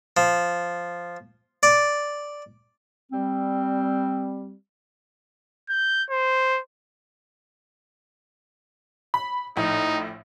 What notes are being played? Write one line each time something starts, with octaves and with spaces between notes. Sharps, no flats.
F3
D5
G3 C4
G6
C5
B5
A#1 A2 D#4